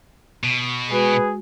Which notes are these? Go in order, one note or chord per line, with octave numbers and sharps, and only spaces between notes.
B2
G#3 F#4 G#4 B4